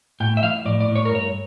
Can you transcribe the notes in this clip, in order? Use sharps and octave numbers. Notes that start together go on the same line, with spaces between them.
A2 G5
E5
F3 F5
A2 D5
D5
A2
C#5
A#4
G2 C#5